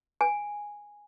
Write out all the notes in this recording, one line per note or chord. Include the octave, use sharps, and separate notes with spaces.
G#5